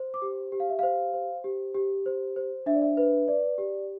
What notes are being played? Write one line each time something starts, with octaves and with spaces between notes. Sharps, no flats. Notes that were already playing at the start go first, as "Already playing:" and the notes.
Already playing: C5
D6
G4
G4
F5
E5
C5 F5
C5
G4
G4
C5
C5
D4 E5
D5
E5
B4
D5
G4